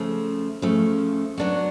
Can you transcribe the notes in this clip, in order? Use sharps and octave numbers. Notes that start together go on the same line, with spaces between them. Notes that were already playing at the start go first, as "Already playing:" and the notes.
Already playing: C#3 F3 A3
C#3 F3 A3
F#3 B3 D4 F#4